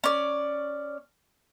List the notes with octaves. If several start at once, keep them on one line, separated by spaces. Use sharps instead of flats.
C#4 D5